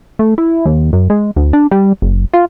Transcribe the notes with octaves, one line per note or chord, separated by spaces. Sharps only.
A3
E4
D#2
F#2
G#3
D2
D4
G3
F#1
F4